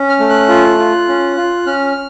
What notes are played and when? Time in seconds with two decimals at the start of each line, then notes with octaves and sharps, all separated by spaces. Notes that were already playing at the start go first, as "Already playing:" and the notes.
Already playing: C#4
0.09 F6
0.20 A3
0.29 F#6
0.49 F4
0.79 F4
1.08 C#4
1.37 F4
1.66 C#4 F6